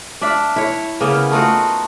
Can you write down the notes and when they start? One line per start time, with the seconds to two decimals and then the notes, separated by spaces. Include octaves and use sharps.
0.21 D4 D5 E5 F5
0.56 E4 C#5
1.01 C#3 A#3 B3
1.31 A3 D#4 F4 F#4